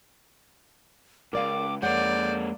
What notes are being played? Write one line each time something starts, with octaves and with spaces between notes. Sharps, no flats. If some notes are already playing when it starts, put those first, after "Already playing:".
C#2 F#2 A#4 D5 F5 D6
F2 G#3 A#3 C#5 D5 F#5 G6